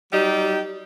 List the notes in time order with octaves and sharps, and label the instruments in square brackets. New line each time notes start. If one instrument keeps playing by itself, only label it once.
[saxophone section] F#3 G3 D#4 G4